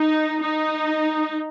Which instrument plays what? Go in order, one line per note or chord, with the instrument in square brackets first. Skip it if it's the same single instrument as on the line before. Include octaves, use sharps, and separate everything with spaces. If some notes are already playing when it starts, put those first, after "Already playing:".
Already playing: [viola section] D#4
D#4